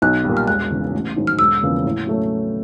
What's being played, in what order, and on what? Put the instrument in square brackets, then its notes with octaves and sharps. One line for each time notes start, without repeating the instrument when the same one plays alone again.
[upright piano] B1 [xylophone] F#6
[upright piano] A#2 G3
[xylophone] F6
[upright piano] E1 [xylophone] F#6
[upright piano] E2 C#3
A1
G#2 D#3 F#3
[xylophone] F6
[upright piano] E1 [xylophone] E6
[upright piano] E2 C#3 F3 A#3
A2
F#3 A3 C#4